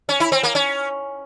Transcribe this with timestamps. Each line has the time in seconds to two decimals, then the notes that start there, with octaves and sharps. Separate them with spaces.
0.09 C#4
0.20 E4
0.32 C4
0.43 A#3
0.55 C#4